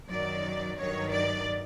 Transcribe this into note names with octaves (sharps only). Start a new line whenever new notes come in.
F#2 D#3 F#3 D5
G2 D#3 F#3 C#5
D5